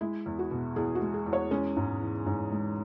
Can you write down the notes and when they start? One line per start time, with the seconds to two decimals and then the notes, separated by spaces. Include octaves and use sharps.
0.01 G#3 E4
0.26 E2
0.39 F#4
0.51 B2
0.76 E2 G#4
0.95 F#4
1.01 G#3
1.14 G#4
1.26 E2
1.33 C#5
1.51 G#3 C#4
1.77 G#2
2.01 E3
2.26 G#2
2.52 G#3